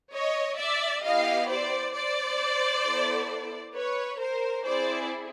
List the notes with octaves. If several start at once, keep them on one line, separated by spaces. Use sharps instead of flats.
C#5 D#5
D5 E5
B3 E4 G4 D#5 F5
C5 D5
C5 D5
B3 E4 A4
B4 C#5
A#4 C5
C4 E4 G#4 C5 D5